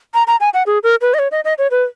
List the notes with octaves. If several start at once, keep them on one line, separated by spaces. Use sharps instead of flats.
A#5
A#5
G#5
F#5
G#4
A#4
B4
D#5
C#5
D#5
D#5
C#5
B4